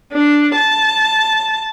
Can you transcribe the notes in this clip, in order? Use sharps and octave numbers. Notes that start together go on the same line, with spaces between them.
D4
A5